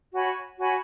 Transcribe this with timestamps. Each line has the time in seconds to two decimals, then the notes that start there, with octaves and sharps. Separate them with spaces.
0.12 F#4 C#5 G#5 B5
0.59 F#4 C#5 G#5 B5